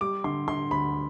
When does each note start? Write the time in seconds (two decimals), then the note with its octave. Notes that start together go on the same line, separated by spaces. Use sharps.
0.01 G3 D6
0.24 D3 C6
0.48 D3 C6
0.71 D2 B5